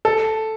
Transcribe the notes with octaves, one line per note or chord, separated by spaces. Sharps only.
A4